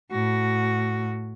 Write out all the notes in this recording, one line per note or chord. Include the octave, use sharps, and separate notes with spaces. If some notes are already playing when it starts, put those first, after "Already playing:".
A2 F#4